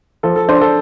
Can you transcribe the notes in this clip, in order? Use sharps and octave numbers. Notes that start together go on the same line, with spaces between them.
F3 A4
A4
D4 C5
A4